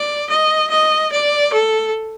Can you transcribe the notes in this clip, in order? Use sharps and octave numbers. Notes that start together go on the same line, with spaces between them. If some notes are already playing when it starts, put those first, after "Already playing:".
Already playing: D5
D#5
D#5
D5
A4